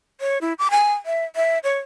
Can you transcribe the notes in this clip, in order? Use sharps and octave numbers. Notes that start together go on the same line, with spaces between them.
C#5
E4
D6
G#5
E5
E5
C#5